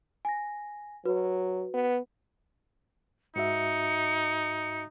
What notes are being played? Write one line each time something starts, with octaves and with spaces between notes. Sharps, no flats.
G#5 A#6
F#3 F#4 B4
B3
G#2 D#4 F#4 E5 C#7